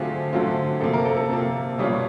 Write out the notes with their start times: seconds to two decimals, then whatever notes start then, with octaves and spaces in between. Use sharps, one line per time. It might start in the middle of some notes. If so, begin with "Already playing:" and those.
Already playing: D3 F#3 A3 C4 F4 G#4
0.33 D3 F#3 A3 C4 F4
0.81 C3 F3 A#3 A4
0.93 A#4
1.05 A4
1.17 A4
1.29 C3 F3 A#3
1.78 B2 G3 A#3 C#4 F4